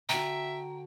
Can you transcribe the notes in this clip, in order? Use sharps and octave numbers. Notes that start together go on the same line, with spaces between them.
D3 F#4 E5 G5 A#5